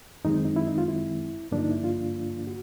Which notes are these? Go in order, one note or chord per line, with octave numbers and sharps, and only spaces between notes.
F#2 D#3 G#3 C4 D#4
D#4
E4
D#4
F4
E4
G2 D3 F3 A#3 D4
D#4
E4
F4
F#4